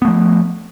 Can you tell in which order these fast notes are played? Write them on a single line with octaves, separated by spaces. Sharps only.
B3 A3 F3